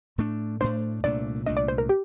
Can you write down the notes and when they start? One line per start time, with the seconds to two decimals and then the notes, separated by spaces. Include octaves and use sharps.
0.18 A2 A3 D4
0.61 A2 A3 D4 C5
1.04 C2 A#2 A3 D4 D5
1.46 C2 A#2 A3 D4 D#5
1.57 D5
1.68 C5
1.78 A#4
1.89 G4